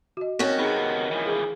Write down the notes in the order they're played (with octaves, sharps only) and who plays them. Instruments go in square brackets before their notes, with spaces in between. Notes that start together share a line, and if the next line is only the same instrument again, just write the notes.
[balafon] F#4 D#5
[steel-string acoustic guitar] D#3 C#4 F#4 [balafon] C4 C#5
[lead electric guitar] C3 B3 [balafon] D#4 G#4
[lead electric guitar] E3 F3
[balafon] G#4